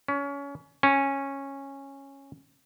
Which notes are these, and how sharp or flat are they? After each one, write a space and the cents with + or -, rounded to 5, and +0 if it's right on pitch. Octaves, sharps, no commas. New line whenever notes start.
C#4 +25
C#4 -10